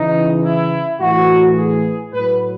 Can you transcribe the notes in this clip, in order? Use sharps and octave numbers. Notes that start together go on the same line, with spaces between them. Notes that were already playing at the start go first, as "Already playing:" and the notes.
Already playing: C#3 E3 D#4
E4
A2 E3 F#4
G#4
A2 F#3 B4